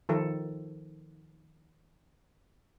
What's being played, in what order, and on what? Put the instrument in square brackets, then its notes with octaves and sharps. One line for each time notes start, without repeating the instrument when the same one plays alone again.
[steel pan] D#3 F3 A4